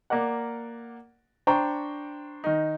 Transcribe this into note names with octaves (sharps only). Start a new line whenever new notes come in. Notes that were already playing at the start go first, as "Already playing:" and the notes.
A#3 A#4 D5 F#5
D4 C5 G5 A#5 C#6
D#3 D#4